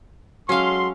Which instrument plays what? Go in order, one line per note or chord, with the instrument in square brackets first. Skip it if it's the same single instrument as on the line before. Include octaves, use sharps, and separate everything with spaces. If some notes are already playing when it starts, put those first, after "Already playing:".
[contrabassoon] F#3 [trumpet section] G#3 A4 C6 [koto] C#4 F5